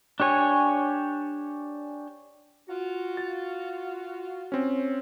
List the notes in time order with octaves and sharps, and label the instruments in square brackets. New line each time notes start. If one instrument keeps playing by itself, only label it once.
[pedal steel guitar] D4 G4 C#5 G#5
[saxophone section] F4 F#4
[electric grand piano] A6
C4 C#4